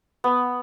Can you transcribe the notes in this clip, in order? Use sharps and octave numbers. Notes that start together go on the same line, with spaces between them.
B3